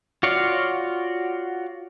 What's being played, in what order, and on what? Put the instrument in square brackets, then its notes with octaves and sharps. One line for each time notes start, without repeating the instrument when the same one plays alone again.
[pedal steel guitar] F4 F#4 C#5 D5 F5